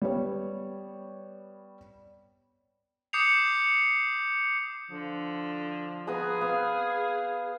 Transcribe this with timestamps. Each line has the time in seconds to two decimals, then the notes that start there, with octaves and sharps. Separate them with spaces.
0.02 G3 B3 C#5
3.13 D6 D#6 G6 C7 C#7 F7
4.90 D3 F3
6.07 B3 G#4 B4 A#5
6.41 B3 F5